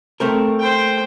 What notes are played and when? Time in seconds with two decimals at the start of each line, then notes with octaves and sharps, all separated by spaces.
0.20 A3 C4 A#4
0.60 C5 G5